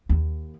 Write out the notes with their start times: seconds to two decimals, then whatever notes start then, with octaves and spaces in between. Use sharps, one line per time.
0.09 D#2